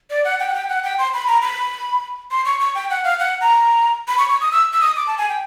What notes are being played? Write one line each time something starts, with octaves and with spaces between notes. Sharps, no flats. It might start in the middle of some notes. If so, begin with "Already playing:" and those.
D5
F#5
G5
F#5
G5
F#5
G5
C6
B5
A#5
B5
C6
C#6
C#6
G5
F#5
F5
F#5
A#5
B5
C#6
C#6
D#6
E6
E6
D#6
D6
A5
G#5
G5